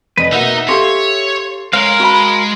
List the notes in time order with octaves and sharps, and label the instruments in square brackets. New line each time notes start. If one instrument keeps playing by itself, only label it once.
[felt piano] F1 D#5 [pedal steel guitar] B4
[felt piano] B2 A#3 F#5 [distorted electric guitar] D#4 [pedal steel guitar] E5
[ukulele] G4 F5 [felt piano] A4 C6 [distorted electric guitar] C#5
[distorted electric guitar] G#3 [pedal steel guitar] A#4 F5 [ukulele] C#5
[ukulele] F#4 B5